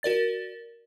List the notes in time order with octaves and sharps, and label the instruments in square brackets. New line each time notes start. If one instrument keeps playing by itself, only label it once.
[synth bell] F#4 A#4 D5 A6